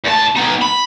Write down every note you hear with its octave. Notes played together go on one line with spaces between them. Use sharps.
E2 A5
B3 D#4
B5